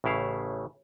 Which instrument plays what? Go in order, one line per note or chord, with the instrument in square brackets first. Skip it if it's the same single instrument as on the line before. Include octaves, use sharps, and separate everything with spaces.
[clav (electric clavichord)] A1 A2 C#3 E4 F5